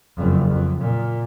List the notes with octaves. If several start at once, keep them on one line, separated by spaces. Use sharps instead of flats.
F#1 F2
F2
A#2